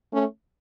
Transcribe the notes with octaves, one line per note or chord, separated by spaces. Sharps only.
A3 C#4